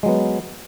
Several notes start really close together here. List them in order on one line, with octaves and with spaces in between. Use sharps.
G#3 F#3 B3